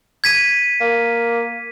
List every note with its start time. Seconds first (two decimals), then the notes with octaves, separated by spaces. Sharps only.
0.24 G#6 B6 D#7
0.80 A#3